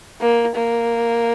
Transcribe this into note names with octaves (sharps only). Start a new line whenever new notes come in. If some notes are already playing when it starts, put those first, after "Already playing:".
A#3
A#3